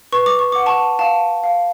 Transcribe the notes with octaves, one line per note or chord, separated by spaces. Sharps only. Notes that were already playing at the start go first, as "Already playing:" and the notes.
B4 C#6
D6
C#6
F#5 D6
A5 C#6
F5 A5
F5